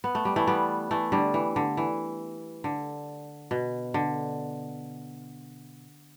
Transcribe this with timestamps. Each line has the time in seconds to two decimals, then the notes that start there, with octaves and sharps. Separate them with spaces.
0.04 B3
0.15 A3
0.25 G3
0.36 E3 A3
0.47 G3 B3
0.91 E3 A3
1.12 D3 G3
1.34 E3
1.56 D3
1.77 E3
2.64 D3
3.51 B2
3.94 D3